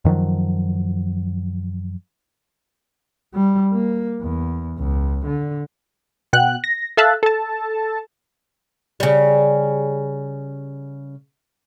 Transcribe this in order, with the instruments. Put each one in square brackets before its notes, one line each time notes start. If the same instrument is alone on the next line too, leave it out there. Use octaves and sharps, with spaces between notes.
[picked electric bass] F#2 D#3 F3 F#3
[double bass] G3
A#3
E2
C#2
D3
[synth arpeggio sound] B2 F#5 G5 F#6
A#6
A4 E5 F5 A5 E6 F#6
A4 A5
[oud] C#3 G3